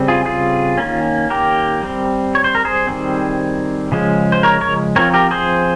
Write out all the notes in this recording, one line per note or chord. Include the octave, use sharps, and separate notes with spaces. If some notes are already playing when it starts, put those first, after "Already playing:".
Already playing: C#3 G3 C4
F4 G#4
F4 G#4
D#3 A#3 C#4
G4 A#4
G3 C4
C#5
C5
A#4
G#4 C5
D#3 G3 C4
C#3 F3 G#3 C#4
C5
A#4 C#5
A#4 C#5
F3 C4 A#4 C#5
G4 A#4
G#4 C5